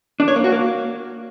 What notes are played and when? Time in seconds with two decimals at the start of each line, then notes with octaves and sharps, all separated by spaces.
0.20 D4
0.28 C#5
0.36 A#3
0.44 F#4
0.52 A#3